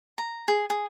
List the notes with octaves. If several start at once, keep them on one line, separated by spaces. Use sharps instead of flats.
A#5
G#4
G#4